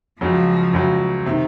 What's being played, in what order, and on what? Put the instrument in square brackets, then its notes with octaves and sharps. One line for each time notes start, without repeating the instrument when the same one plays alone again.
[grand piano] C#2 C#3 F#3 [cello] F3
[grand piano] C#2 C#3 F#3
C3 D#3